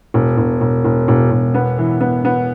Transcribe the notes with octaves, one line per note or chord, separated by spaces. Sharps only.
E1
E1
E1
E1
E1
E1
B3
E3
B3
B3